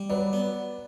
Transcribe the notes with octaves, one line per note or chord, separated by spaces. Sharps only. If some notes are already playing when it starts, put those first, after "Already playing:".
Already playing: G3
F#3 B4 D5
B3